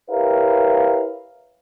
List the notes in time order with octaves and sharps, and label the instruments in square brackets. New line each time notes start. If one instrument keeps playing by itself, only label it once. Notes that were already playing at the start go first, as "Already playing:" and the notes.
[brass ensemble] E4 G4 A#4 B4 C#5 F5